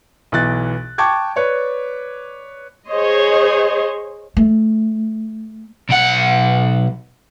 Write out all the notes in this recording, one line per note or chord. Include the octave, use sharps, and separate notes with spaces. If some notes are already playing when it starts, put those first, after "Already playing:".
B1 E3 F#6 A6
G5 A5 C#6 D6 G#6
B4 C#5 D5
G#4 C5 C#5 D#5
A3
B1 F#5